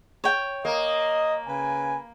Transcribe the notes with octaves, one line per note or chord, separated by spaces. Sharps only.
C#5 G5
A#3 D#5
C#3 B4 G#5